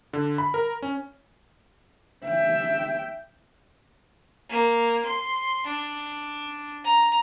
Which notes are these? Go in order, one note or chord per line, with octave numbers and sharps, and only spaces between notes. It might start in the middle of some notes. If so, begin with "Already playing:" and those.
D3
B5
A#4
C#4
E5 G5
A#3
C6
D4
A#5